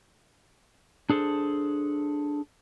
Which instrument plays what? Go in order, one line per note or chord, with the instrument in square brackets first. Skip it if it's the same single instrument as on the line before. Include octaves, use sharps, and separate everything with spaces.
[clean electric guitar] D4 G#4 A4 C5